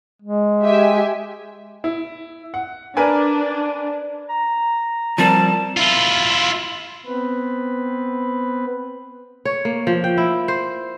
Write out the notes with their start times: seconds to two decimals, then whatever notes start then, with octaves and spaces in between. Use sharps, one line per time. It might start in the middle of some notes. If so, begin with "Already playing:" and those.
0.22 G#3
0.64 G4 E5 G#5
1.84 E4
2.54 F#5
2.97 D4 A#4 B4 G#5
4.29 A#5
5.18 F3 G3 C4 A#4 A5
5.77 E4 F4
7.06 B3 C4 B4
9.45 C#5
9.65 A#3
9.87 F3
10.04 G5
10.17 E4
10.48 C5